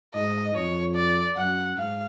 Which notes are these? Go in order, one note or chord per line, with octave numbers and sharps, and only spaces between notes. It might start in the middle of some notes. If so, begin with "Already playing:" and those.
G#2 D#5
F2 C#5
D5
F#2 F#5
G#2 F5